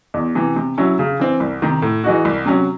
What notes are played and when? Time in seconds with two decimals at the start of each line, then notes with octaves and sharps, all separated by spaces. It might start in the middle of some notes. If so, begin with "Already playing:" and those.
0.14 E2
0.35 C3 E3
0.56 C3
0.78 F#3 C#4 E4
0.99 C#3
1.19 E3 C4
1.40 C2
1.62 C3 D#3
1.82 A2
2.04 E3 G#3 D#4 F#4
2.25 C2
2.46 C3 F#3 C#4